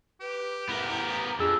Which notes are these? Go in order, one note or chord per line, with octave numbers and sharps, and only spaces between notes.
G4 B4
B3 E4 A#4
A#5
F2 D4 G#4 E6